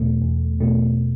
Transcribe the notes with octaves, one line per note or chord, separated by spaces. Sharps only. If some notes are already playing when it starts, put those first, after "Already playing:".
Already playing: E2 B2 A3
E2
B2 A3